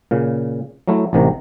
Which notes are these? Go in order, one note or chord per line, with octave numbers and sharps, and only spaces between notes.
A#2 C#3
F#3 A3 E4
A1 C3 D#3 A#5